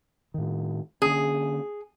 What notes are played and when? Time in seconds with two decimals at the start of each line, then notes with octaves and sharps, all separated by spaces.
0.34 A2 D#3
1.02 D3 A#3 C#4 G#4